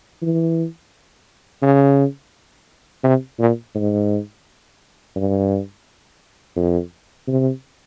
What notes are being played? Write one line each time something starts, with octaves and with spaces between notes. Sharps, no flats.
E3
C#3
C3
A#2
G#2
G2
F2
C3